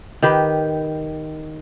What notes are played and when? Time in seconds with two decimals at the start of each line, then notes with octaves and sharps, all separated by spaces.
0.22 D#3 G4 B4